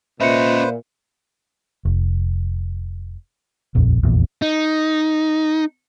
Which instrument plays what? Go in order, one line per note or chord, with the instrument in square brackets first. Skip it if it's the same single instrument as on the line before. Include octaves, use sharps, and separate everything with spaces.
[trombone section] A#2 [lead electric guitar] C#4 D#5 [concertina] B4 C5 [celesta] E5 C#7
[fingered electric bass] F1
D#1 A#1 F2
F1 A#1 E2 A#2
[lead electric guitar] D#4